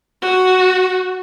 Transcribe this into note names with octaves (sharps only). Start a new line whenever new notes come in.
F#4